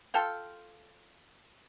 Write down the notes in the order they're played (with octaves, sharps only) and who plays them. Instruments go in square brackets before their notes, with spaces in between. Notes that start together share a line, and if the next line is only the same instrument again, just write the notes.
[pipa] F4 A4 F5 G5